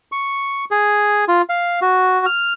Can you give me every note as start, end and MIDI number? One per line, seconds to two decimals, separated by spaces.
0.12 0.65 85
0.71 1.25 68
1.28 1.42 65
1.49 1.80 77
1.81 2.26 66
2.26 2.53 89